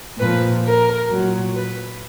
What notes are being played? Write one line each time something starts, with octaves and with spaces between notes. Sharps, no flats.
A#2 F3 B4
A#4
A#2 F#3
B4